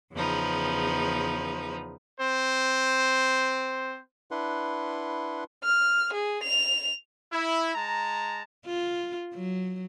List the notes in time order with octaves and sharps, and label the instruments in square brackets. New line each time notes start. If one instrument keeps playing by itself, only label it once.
[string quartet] E2 C#3 F3 D#4 B4
[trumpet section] C4 C5
[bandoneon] D4 E4 B4 F#5 C6
[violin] F6
G#4
F7
[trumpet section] E4
G#3 A5 A#5
[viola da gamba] F4
F#3